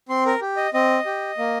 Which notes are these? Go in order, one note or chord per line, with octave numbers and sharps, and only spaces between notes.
C4 C6
A#4
G4
D#5
C4 D#5
G4
A#3